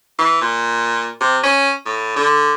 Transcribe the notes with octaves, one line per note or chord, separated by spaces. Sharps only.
E3
A#2
C3
C#4
A2
D3